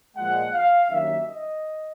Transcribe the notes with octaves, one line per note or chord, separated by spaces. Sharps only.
A#2 F3 G#3 F#5
F5
G2 D#3 F#3 A#3 C#4 E5
D#5